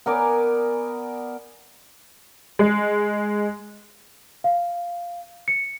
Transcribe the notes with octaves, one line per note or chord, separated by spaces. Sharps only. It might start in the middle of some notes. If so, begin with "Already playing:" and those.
B3 A#4 D5 G#5
G#3
F5
C#7